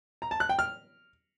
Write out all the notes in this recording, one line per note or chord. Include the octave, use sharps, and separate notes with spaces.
A#5
A5
F#6
G5
F6